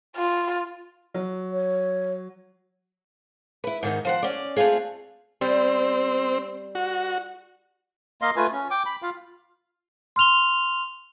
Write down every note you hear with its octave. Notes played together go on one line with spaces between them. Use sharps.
F4
F#3
C#5
E4 B4
G#2 D#3 D#4
F3 C5 F#5
C#4 D5
A3 C4 D4 F4 G#4
G3 C4
F#4
A#3 D#5 F5 C6
A3 F4 B4 G#5
C#4
G5 D6
B5
F4 F5
C6 F6 F7 G7